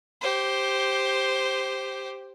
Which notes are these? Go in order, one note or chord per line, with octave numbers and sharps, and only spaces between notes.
G4 C5